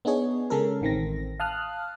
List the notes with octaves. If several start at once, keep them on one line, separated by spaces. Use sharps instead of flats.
B3 D4 D#4 G#4 C#5
C#3 G#3 C#4 A4 A#4
A1 D#3 C4 A#6
F5 A5 D#6 F6 F#6